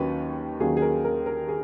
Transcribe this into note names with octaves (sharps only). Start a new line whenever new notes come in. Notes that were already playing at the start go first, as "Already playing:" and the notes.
Already playing: D#2 D#3 F#3 A#3 C#4 B4
D#2 D#3 F#3 A#3 C#4 G#4
G#4
A#4
A#4
A#4
G#4